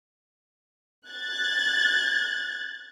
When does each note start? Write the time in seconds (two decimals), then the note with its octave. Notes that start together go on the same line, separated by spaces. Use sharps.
1.08 F#6 G#6 A6